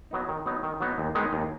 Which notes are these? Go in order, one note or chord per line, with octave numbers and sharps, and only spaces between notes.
F#3 B3 D#4
D#3
F#3 B3 D#4
D#3
F#3 B3 D#4
D#2
D#3 G#3 B3 D#4
D#2